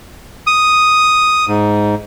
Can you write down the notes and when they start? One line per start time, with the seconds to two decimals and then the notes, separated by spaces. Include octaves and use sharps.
0.47 D#6
1.48 G#2